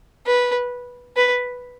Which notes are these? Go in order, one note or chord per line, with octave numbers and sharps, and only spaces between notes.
B4
B4